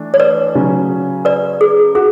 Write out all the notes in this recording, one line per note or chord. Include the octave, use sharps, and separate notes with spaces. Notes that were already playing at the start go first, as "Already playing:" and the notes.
Already playing: E3 A3 D4
C#5
B4 D5
C#3 F#3 C#4
B4 D5
G#4
F#4 G#4